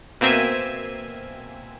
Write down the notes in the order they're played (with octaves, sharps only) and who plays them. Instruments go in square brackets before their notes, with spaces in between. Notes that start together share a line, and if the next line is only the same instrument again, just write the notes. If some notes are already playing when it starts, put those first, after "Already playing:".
[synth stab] B2 A#3 C4 E5 G#5